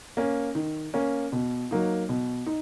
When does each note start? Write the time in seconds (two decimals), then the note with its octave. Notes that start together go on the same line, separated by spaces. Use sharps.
0.17 A#3 C#4
0.55 D#3
0.94 A#3 C#4
1.32 B2
1.71 F#3 A#3 D#4
2.09 B2
2.46 D#4